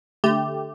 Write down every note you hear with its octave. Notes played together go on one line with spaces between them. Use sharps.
D3 A3 G4